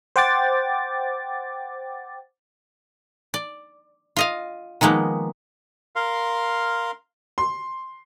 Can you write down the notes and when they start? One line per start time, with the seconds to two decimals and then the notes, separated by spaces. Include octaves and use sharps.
0.16 C5 F#5 G5 D6 A6
3.34 D5
4.16 F4 D#5 F5
4.81 D#3 F3 G#3 A#3 B3
5.96 A#4 F5 C6
7.38 C6